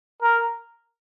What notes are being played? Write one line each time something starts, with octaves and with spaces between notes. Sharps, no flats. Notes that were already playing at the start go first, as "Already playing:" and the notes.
A#4